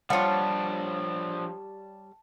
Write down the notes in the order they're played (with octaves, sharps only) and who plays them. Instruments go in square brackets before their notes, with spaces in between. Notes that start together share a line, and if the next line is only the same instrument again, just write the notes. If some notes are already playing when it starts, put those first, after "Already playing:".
[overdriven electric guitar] F3 D4 [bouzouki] G3 C#5 [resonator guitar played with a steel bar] F4 F5 F#5 [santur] A5